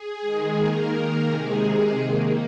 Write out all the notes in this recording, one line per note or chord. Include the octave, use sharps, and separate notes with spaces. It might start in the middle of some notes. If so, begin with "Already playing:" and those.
Already playing: G#4
D#3 G#3
D#3 A#3 A#4
D#3 A#3
C3 D#3 G#3 G#4
C3 G#3
D#3 A#3